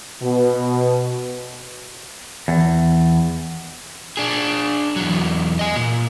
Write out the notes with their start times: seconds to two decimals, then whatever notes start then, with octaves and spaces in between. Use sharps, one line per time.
0.23 B2
2.48 E2
4.17 D4 G#4
4.96 E2 F#3
5.59 D#5 G#5
5.76 A#2